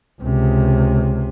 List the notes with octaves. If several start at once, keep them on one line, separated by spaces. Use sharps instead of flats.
C#2 C3